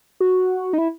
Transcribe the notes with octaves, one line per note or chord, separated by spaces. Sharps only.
F#4
D#4
E4